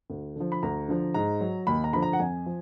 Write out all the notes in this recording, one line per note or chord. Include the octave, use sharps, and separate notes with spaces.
D2
D3 F3
B5
D2 A#5
D3 F3
G#2 A#5
F#3
D#2 B5
A#5
D3 F3 B5
A#5
F#5
F2 G#5
F3